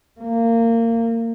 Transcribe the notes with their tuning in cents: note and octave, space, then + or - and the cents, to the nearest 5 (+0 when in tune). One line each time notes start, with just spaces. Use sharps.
A#3 -25